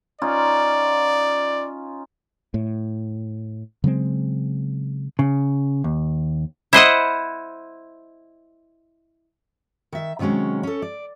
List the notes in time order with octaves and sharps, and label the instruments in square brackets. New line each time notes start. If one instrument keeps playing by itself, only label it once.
[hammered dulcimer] C#4 D#4 F4 [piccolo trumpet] D5
[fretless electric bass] A2
C#3 F#3 G#3 C4
[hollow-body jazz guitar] C#3
D#2
[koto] E4 C5 D#5 F#5
[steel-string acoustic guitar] D#3 E5
C3 D#3 F#3 G#3 C#4
C#4 A4
D5